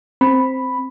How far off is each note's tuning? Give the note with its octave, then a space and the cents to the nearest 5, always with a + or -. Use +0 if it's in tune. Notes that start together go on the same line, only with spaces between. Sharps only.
C4 +0 B5 +0